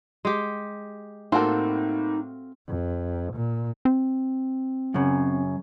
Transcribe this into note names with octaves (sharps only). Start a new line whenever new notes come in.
G#3 G4
A2 A#3 C4 D#4 F4 F#4 A4
F2
A#2
C4
F#2 C#3